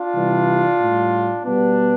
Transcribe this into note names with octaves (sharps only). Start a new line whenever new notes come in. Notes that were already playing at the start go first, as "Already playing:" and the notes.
Already playing: D4 F4
C3 E3 G3
A2 G3
B2 G3 B3 D4